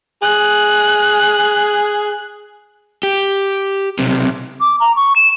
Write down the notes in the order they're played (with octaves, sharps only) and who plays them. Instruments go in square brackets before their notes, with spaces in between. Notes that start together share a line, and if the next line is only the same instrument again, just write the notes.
[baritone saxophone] G#4 [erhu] F#6
[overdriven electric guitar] G4
B1 C3
[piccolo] D6
A#5
C#6
E7